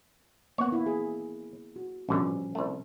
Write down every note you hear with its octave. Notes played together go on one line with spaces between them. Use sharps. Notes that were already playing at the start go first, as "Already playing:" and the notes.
A#3 B3 C#5 F#5
E4
G#4
F#4
A1 B2 D3 F3 G3 C#4
C2 A3